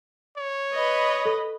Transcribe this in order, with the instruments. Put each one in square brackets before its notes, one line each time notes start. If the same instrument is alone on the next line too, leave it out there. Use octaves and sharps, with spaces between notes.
[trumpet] C#5
[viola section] B4 D#5 B5
[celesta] A4